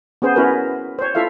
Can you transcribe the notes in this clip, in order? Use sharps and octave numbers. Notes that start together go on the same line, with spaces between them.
B3 C#4 G#4 C5
B3 C#4 E4 F#4 A#4 B4
C5 C#5
E4 F4 A4 E5 F5